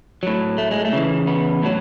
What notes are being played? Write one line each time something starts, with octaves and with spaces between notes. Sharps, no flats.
A2 F#3
A3
G#3
A3
C#3 E3
B3
A2 F#3